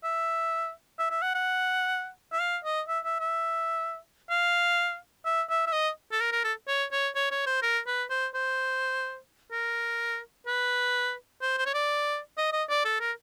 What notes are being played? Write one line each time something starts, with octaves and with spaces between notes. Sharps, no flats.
E5
E5
E5
F#5
F#5
E5
F5
D#5
E5
E5
E5
F5
E5
E5
E5
D#5
A4
A#4
A#4
A4
C#5
C#5
C#5
C#5
C5
A#4
B4
C5
C5
A#4
B4
C5
C5
C#5
D5
D#5
D#5
D5
A4
A#4